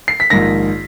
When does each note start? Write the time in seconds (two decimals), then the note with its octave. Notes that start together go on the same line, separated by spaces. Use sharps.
0.08 C7
0.20 B6
0.30 A#1 G#2 D#3 A#6